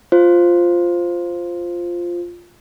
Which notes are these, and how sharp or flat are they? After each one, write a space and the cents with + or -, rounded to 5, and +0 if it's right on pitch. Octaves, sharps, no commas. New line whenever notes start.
F4 +0 C5 +0